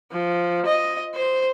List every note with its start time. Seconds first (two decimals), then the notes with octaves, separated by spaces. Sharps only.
0.12 F3
0.66 D#5
1.14 C5